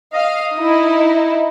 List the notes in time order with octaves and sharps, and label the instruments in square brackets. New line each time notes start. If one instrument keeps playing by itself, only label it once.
[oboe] D#5 [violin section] F5
[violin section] D#4 E4